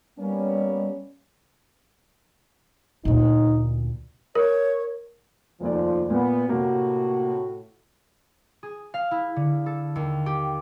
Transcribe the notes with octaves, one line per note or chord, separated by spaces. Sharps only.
G3 A#3 B3 C#4
D2 A#2 D#4
A#4 C#5
F1 D#2 F3 D5
A#2 B3
A2 C3 A#3 F#4
G#4
F5
E4
D3
A4
D#2
G4